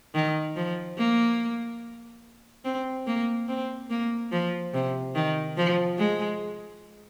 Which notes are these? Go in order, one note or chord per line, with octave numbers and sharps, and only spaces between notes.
D#3
F3
A#3
C4
A#3
C4
A#3
F3
C3
D#3
F3
G#3